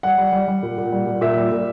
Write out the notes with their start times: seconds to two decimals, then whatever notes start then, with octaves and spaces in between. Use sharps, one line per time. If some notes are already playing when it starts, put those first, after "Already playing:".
0.03 G3 F#5
0.18 G3
0.32 G3
0.48 G3
0.63 A#2
0.78 A#2
0.92 G3
1.07 A#2
1.21 A#2 E5
1.37 G3
1.52 A#2